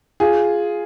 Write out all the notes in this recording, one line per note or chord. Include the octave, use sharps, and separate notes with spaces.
F4 G#4